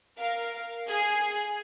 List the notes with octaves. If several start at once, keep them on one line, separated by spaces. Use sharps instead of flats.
A#4 F5
G#4 C7